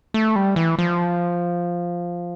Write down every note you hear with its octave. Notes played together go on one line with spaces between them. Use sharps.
A3
G3
E3
F3